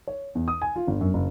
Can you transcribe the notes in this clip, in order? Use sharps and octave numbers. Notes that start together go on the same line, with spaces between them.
C#5
E2
D#6
G#5
F4
G1
F#2
F#1